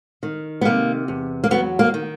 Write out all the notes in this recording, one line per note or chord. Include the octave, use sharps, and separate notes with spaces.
D#3
B3
C3 A#3
E2
A#3
F#3 B3
A#3
D#3